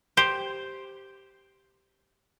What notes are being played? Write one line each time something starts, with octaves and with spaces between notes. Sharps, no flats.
G4 C5